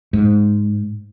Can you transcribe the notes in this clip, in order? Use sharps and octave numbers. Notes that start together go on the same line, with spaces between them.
G#2